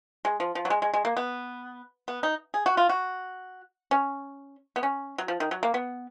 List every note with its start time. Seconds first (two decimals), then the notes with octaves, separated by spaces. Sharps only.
0.25 G#3
0.40 F3
0.55 F3
0.65 F#3
0.70 G#3
0.82 G#3
0.94 G#3
1.05 A#3
1.17 B3
2.08 B3
2.23 D#4
2.54 G#4
2.66 F#4
2.77 F4
2.89 F#4
3.91 C#4
4.76 B3
4.83 C#4
5.18 F#3
5.28 F3
5.40 D#3
5.51 F#3
5.63 A#3
5.74 B3